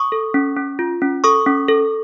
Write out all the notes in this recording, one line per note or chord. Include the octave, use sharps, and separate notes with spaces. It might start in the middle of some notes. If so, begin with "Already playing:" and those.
Already playing: C#6 D#6
A4
C#4
C#4
F4
C#4
A4 C#6 D#6
C#4
A4